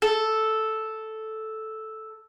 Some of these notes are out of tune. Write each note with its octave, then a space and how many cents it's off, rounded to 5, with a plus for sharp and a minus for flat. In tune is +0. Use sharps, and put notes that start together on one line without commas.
A4 -5